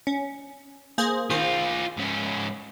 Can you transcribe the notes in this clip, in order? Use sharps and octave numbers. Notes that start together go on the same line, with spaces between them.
C#4
A#3 G#4 C5
D#3 F4 G#4 C5
G#2 C#4